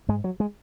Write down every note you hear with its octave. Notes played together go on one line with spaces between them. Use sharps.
G#2 G#3
F#3
G#3